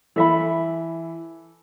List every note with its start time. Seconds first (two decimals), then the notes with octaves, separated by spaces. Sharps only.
0.16 E3 A4 E5 B5